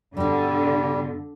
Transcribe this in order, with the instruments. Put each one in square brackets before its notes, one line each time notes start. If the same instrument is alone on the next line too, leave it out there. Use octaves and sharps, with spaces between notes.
[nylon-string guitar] G2 B2 [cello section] D3 [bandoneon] G3